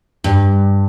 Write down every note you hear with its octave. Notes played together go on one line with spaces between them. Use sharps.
G2